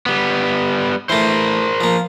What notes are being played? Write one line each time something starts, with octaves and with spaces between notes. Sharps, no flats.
G3 B3
E3 A3 A#4 C5
F3 A#3